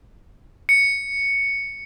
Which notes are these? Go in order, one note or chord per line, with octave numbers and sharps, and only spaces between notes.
C#7